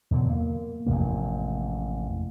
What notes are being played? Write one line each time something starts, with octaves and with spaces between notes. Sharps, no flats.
E2 B2 D3 F#3
A#3
A1 F2 C3 A#3